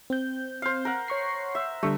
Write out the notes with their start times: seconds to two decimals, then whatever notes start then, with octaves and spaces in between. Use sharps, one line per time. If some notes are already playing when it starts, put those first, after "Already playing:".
0.10 C4 G6
0.62 C5 F5
0.85 A#4 F#5
1.08 C#5 C#6 C7
1.55 E5
1.83 D3 G3 A3